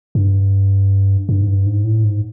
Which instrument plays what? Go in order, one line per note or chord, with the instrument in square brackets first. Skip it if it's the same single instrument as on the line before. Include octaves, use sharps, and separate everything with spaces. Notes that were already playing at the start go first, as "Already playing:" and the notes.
[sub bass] G2
G2
G#2
G2
G#2
A2
G#2